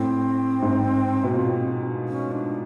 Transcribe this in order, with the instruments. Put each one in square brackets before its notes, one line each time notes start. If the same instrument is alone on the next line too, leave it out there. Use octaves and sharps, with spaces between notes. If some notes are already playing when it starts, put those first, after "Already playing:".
Already playing: [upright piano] A2 [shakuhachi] C4
[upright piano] G#2
B2
A#2
[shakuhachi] C#4
D4